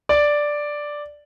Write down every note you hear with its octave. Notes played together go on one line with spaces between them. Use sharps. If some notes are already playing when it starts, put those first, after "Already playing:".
D5